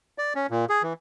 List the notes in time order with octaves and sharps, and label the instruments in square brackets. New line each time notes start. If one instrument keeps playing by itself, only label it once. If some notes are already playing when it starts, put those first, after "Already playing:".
[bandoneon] D5
C#4
A#2
G#4
E3